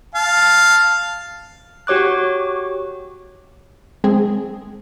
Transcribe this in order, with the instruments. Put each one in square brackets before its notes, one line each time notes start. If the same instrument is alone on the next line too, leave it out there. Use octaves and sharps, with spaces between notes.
[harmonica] F5 A5
[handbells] F#4 G4 C#5 D6 F#6
[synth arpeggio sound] G#3 C4 G#4